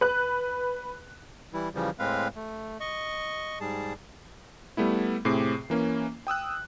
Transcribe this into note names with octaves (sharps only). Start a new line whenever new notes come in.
B4 F#6
E3 G3 E4
C#3 E3 F3 G3
A2 G#3 C4 B4 F5
A3
D#5 C#6
G#2 G3 G#4 A5
G3 A3 B3 E4
A2 C3 C4 G#4 D6 C7
E3 A#3 C#4
G5 D#6 E6 F#6